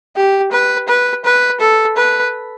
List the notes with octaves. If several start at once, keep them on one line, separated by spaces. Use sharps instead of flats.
G4
B4
B4
B4
A4
B4